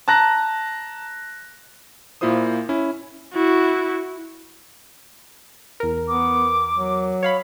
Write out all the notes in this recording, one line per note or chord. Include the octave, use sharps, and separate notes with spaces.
A5 A#5 F#6 A#6
A#2 A#3 E4 F4 C5 D#6
C#4 E4
E4 F#4
E2 A#4
B3 D6
F#3
C#5 F5 B5